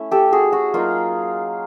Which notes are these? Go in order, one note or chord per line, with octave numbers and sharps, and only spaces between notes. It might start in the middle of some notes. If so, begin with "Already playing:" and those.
Already playing: A3 C#4 E4
G4 A4
F#4 G#4
F#4
F#3 A#3 D#4 F4